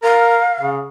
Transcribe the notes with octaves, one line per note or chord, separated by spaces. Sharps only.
A#4 F5
C#3